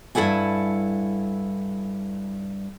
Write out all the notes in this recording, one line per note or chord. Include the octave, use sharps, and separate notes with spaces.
G2 E4 A4 F#5 G#5